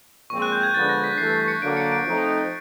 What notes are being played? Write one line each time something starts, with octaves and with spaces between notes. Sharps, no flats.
A#2 F3 G#3 C4 C#6
F#6
G6
G#6
D3 F3 G#3 B3 D4 A6
A#6
B6
G2 E3 A3 C7
C7
C#7
D3 F#3 A#3 D7
C#7
D7
F3 A3 C4 D#4